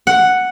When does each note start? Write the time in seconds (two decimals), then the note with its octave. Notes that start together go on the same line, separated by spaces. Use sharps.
0.07 F#5